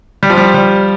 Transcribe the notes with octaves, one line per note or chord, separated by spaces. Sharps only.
G3
F3
G3
G3